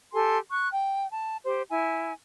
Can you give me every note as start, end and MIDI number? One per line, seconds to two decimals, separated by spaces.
0.13 0.38 67
0.13 0.38 69
0.13 0.38 80
0.13 0.38 84
0.50 0.69 85
0.50 0.69 90
0.72 1.10 79
1.11 1.37 81
1.45 1.62 67
1.45 1.62 72
1.69 2.13 64
1.69 2.13 80